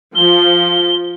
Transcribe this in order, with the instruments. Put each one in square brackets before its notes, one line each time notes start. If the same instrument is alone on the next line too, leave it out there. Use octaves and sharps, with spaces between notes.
[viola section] F3 [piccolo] G7